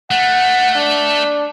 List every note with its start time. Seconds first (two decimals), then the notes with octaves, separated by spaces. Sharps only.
0.11 A3 F#5
0.76 D4